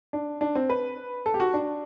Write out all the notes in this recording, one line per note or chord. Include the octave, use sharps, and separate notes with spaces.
D4
D4
C4
B4
A4
G4
F#4
D4